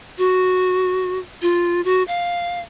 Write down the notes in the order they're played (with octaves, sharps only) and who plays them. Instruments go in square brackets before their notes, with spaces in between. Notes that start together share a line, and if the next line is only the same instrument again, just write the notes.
[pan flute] F#4
F4
F#4
F5